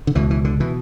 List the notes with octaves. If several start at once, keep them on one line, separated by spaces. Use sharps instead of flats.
D3
C#2 B2 E3
E3
D3
B2 E3